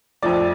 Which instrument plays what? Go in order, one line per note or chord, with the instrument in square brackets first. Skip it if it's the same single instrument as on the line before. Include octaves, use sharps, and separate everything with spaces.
[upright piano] F2 F3 A3 D5